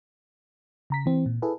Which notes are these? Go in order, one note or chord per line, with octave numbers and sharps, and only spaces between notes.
C#3 A#5 B6
E3 C4
A#2
E4 G#4 A4 B4